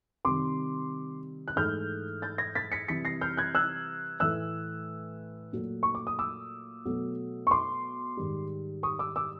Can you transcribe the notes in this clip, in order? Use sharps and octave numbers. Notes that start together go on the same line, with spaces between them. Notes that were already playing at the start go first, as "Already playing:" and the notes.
C3 D#3 G3 C6 D6
F#6
G#2 E3 A3 F6 G6
G6 A6
G#6 A#6
A6 B6
B6 C#7
C3 E3 G3 B6 C#7
A#6 C7
F6 G6
F#6 G#6
E6 F#6
A2 E3 A3 E6 F#6
A#2 F#3 A3
C#6
D6
D#6
D6 E6
B2 F#3 A3
C#6
C6 D6
G#2 D#3 G3
C#6 D#6
D6 E6
D6 E6